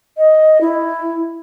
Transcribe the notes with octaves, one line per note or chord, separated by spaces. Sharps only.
D#5
E4